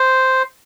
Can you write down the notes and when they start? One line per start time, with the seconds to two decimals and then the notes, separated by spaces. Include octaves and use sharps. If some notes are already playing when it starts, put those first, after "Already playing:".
Already playing: C5